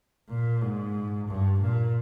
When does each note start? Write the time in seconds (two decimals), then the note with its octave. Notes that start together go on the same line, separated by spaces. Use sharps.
0.29 A#2
0.61 G#2
1.28 G2
1.61 A#2